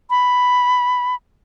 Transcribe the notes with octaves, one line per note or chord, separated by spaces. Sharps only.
B5